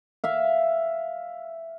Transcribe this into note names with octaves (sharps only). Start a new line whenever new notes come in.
E5 F5